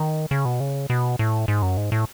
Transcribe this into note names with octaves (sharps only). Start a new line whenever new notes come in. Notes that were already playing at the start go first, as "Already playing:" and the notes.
Already playing: D#3
C#3
B2
C#3
B2
A2
G#2
F#2
G#2
A2